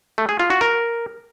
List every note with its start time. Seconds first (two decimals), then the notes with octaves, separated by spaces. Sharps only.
0.18 A3
0.29 G#4
0.39 F4
0.50 F#4
0.61 A#4